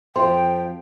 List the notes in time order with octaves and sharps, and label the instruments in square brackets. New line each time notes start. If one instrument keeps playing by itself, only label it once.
[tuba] F2 [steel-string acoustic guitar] F3 [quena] G5 [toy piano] C6